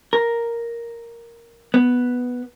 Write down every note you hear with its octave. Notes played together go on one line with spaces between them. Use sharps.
A#4
B3